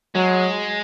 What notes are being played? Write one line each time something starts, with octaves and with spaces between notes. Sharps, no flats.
F#3 G#3